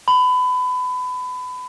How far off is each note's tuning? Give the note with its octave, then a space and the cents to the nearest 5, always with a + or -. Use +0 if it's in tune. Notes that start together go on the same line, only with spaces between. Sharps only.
B5 +25